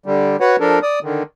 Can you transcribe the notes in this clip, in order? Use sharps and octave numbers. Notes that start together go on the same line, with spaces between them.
D3 G3
F#4 B4 C#5 F#5
F3 D4 A4 A#4
D5 D#6
D3 D#3